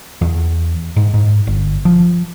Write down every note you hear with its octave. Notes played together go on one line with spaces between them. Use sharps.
E2
G#2
G#2
G1
F3